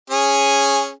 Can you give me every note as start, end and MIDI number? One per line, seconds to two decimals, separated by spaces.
0.10 0.91 61
0.10 0.91 68
0.10 0.91 80